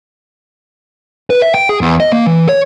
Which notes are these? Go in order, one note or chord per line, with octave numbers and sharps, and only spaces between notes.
B4
E5
G5
G#4
E2
D#5
A#3
E3
C#5